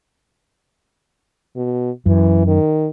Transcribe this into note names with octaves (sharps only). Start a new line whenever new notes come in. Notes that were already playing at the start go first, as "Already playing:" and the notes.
B2
F#2 E3
D#3